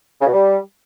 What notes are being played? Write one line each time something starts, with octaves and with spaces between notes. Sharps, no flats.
C#3
B2
G3